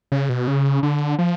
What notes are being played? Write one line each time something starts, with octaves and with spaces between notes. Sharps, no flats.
C#3
B2
C#3
D3
F3